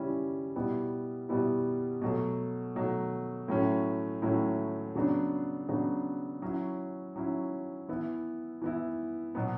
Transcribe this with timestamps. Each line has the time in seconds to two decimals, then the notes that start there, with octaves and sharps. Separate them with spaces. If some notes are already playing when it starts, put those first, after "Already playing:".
Already playing: C#3 E3 G3 C#4 E4
0.56 B2 G3 B3 E4
1.29 B2 G3 B3 E4
2.02 B2 F#3 A3
2.75 B2 F#3 A3
3.48 A2 F#3 A3 C#4 E4
4.22 A2 F#3 A3 C#4 E4
4.96 C#3 F#3 B3 D4
5.69 C#3 F#3 B3 D4
6.42 F#3 C#4 E4
7.16 F#3 C#4 E4
7.89 E3 B3 E4
8.62 E3 B3 E4
9.35 B2 F#3 B3